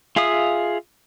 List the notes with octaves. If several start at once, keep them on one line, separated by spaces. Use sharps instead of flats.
F4 G#4 E5 F5 D#6